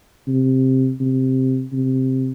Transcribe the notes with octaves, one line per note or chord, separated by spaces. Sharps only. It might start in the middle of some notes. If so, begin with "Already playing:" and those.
C3
C3
C3